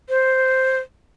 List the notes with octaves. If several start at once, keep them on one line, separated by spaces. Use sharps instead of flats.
C5